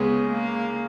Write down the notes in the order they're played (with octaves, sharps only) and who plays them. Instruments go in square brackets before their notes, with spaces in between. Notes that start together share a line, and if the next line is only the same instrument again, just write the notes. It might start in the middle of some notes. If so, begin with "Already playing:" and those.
Already playing: [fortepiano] C#2 C#3 G#3 C#4 G#4 [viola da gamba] B3
[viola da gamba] A#3